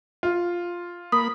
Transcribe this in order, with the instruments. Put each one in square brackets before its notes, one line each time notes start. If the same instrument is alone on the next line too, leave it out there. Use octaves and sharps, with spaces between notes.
[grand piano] F4
[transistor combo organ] A#3 B5 [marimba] D#6